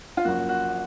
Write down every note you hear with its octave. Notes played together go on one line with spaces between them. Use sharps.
F4
F#1 F#2 F3 A#3 F#4
F#4